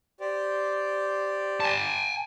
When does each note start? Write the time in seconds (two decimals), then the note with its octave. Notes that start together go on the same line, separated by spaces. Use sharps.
0.20 G4 C5 D5
1.60 G#5 A5